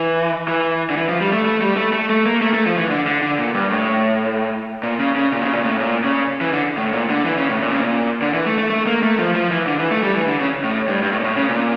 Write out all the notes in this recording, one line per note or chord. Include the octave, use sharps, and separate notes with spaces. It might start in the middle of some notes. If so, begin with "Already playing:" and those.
Already playing: E3
E3
D3
E3
F3
G3
A3
A3
G3
A3
A3
A3
A#3
A3
A3
F3
E3
D3
D3
D3
A#2
G2
A2
A#2
C#3
C#3
A#2
C#3
A#2
A2
A#2
C#3
E3
D3
A2
A#2
D3
E3
C#3
A2
A#2
C#3
A#2
D3
E3
A3
A3
A3
A#3
A3
F3
F3
E3
D3
E3
A3
G3
E3
D3
C#3
A2
G2
G2
A2
A#2
A2
C#3
A#2